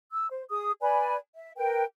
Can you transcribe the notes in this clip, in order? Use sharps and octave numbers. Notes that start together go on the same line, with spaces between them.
E6
C5
G#4 D#6
B4 D5 G#5 B5
E5
A#4 B4 G5